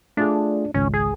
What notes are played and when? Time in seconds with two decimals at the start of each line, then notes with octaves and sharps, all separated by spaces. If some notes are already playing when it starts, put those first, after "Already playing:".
0.17 A3 D4 F4 G#4
0.74 G#1 C#2 C#4
0.94 G#4